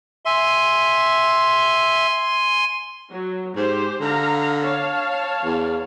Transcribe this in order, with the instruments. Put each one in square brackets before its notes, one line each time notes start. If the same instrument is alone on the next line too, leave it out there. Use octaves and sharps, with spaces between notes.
[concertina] E5 [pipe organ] G#5 C6
[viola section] F#3
[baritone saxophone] G#2 [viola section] G4 C5
[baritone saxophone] D3 [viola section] F5 A#5
[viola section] C#5 F5 A5
[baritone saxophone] E2